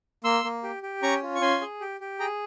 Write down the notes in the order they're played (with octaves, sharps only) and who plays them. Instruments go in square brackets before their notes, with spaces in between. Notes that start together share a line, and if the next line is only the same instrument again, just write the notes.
[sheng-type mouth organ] A#3 C6 E6
A#3
G4
G4
C#4 A#5 C#6
F4
C#6
C#4 G#5 C6
G#4
G4
G4
G#4 G5 A#5